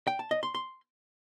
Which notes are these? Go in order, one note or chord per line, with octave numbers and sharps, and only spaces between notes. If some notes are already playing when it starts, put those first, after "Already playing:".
G5
A5
D#5
C6
C6